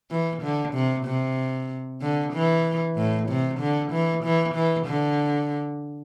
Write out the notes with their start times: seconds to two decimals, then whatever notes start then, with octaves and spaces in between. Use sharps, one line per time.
0.11 E3
0.42 D3
0.74 C3
1.05 C3
2.01 D3
2.33 E3
2.97 A2
3.28 C3
3.60 D3
3.92 E3
4.24 E3
4.54 E3
4.87 D3